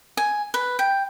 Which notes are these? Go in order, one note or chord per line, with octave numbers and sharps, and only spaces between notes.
G#5
B4
G5